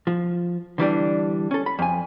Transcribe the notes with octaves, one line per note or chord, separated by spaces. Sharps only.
F3
D3 E3 G3 D4
C#4 A4
B5
F2 G#5